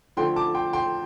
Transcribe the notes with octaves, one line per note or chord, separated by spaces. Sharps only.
D3 F3 A3 G5 C6
A5 D6
G5 C6
G5 C6